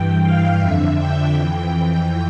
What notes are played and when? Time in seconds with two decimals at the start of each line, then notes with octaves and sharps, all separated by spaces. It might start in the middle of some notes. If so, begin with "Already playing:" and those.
Already playing: G2 E3 G5
0.23 F5
0.59 F2 D3 E5
0.97 G5
1.33 F2 E3